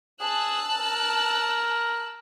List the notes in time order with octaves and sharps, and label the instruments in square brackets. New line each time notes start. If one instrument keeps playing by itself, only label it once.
[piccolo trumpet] G#4 [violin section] A5 E6 F#6
[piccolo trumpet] A#4